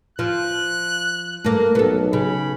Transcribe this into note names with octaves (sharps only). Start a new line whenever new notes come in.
F3 F#6
G2 A3 A#3
B1 B3 A4
C#3 B5